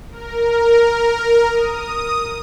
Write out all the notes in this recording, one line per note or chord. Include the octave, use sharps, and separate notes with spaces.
A#4
D#6